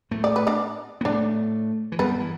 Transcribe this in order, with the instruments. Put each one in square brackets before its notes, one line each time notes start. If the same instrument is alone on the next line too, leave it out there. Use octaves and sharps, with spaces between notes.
[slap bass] A2 A3
[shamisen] D5
B4
D4 D5
[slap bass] B3
[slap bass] A2 A3 [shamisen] D4 D5
[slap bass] E3
[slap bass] G2 G3 [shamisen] B3 B4
[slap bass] E3